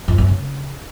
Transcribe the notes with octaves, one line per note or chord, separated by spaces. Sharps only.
F2
F#2
C#3